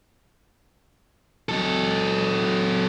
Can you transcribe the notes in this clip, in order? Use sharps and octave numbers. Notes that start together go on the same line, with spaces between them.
F#3 A4